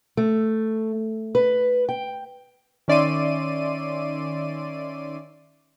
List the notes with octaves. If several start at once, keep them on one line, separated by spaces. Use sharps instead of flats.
A3
B4
G5
D#3 C#4 D5 E5 C6 D#7